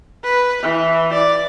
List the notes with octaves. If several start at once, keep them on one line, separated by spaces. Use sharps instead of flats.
B4
E3
D5